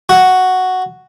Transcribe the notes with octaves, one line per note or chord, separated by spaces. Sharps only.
F#4